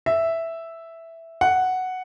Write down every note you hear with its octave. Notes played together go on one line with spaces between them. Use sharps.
E5
F#5